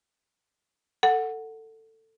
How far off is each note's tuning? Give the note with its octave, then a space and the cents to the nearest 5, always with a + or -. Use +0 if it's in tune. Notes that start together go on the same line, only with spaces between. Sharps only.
A4 +20 F#5 +0